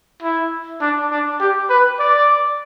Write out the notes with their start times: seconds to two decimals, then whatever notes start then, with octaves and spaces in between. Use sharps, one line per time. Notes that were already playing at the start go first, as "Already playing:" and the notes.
0.22 E4
0.81 D4
1.11 D4
1.40 G4
1.70 B4
1.99 D5